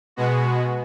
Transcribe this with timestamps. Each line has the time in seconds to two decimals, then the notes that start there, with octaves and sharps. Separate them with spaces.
0.16 B2 G#3 B3 F#4